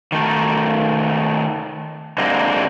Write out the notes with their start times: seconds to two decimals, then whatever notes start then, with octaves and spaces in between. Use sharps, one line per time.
0.12 D#3 A3
2.18 D3 G3 G#3 A#3 C4